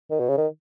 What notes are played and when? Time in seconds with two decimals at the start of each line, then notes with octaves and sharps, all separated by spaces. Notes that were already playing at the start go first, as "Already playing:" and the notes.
0.10 D#3
0.20 B2
0.29 C#3
0.38 D#3